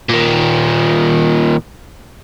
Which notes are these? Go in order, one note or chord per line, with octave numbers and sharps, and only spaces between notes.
A#2 D#3